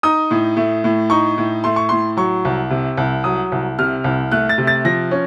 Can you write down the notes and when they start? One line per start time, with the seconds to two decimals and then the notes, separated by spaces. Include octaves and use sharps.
0.03 D#4 D#6
0.31 A2
0.57 A3
0.84 A2
1.10 D#4 C#6
1.38 A2
1.64 A3 C6
1.76 C#6
1.89 A2 C6
2.17 F#3 C#6
2.45 C2
2.70 C3
2.97 C2
3.24 F#3 D#6
3.52 C2
3.79 C3 F6
4.04 C2
4.32 A3 F#6
4.49 A6
4.58 C3
4.67 A6
4.85 F3 A#6
5.11 C#4